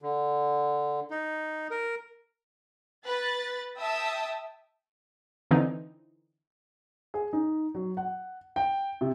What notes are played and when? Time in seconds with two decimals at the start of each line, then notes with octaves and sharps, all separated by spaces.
0.02 D3
1.11 D#4
1.71 A#4
3.05 B4 A6
3.78 E5 G5 A5 D#6 E6
5.51 D3 E3 C4 D#4
7.14 G#4
7.33 D#4
7.75 F#3
7.97 F#5
8.56 G5
9.01 C3